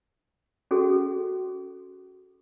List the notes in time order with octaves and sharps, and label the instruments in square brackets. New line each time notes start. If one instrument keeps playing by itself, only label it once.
[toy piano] C#4 F#4 G#4 A4